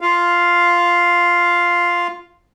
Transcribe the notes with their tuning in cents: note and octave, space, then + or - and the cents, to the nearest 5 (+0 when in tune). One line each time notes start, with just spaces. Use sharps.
F4 +0 F5 +0